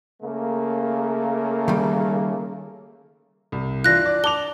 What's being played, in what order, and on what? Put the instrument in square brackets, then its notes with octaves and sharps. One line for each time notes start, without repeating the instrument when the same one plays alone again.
[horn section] C#3 A3 A#3
[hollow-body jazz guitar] D#3 G3
[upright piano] C2
[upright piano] E3 D4 F4 [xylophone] F#6 A#6
[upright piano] D4 D5
[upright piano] A5 D6 F7 [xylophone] G7